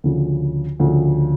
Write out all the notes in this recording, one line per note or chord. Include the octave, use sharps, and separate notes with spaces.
D2 C#3 F3
D2 C#3 F3